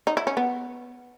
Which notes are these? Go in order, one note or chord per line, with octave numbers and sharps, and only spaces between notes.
D#4
E4
C#4
B3